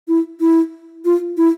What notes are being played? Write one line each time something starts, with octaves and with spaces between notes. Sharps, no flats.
E4
E4
F4
E4